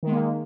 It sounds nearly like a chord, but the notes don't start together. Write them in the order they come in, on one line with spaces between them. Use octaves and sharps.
D#3 G#3 A#3